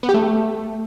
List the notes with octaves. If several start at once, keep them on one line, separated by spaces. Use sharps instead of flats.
B3
G4
A3